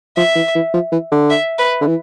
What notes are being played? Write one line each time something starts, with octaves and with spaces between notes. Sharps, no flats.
F3 E5
E3
E3
F3
E3
D3
E5
B4
D3
E3